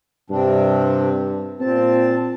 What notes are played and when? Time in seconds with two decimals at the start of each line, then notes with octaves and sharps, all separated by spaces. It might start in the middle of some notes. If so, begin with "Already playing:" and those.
0.30 G2 C3 C4 D4
1.60 A#2 C4 A5